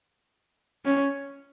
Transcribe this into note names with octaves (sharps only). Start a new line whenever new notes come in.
C#4